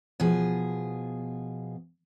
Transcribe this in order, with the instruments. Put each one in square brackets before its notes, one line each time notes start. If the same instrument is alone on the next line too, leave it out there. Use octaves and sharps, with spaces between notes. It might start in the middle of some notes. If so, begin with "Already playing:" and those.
[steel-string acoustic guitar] B2 F3 G#4